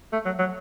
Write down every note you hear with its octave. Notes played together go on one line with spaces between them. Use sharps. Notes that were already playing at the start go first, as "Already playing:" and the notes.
A3
F#3
F#3